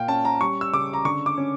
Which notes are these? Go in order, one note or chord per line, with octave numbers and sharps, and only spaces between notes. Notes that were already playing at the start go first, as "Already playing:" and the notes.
Already playing: A#2 F5 G5
C#4 A5
A#5
G3 C#6
E6
C#3 D6
A#5
D3 C#6
D6
C#4